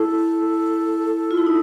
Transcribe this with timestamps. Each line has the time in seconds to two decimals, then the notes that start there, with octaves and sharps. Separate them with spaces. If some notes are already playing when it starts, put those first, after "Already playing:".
Already playing: E4 A4
1.31 F4
1.37 E4
1.47 D#4